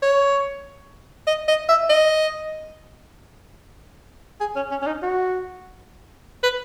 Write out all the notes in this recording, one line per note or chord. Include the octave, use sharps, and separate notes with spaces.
C#5
D#5
D#5
E5
D#5
G#4
C#4
C#4
C#4
D#4
F#4
B4